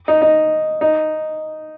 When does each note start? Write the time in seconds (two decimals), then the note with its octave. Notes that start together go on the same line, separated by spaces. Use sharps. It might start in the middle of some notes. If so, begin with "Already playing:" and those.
0.08 D#4
0.22 D#4
0.81 D#4